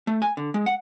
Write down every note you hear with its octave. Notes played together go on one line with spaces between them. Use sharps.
A3
G#5
D3
G#3
F#5